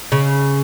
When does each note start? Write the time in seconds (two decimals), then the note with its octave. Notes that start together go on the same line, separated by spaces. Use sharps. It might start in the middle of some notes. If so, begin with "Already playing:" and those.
0.12 C#3